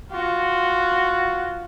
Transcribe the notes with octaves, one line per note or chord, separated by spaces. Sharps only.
F4 F#4